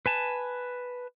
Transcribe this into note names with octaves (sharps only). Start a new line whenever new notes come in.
B4 G#5 A5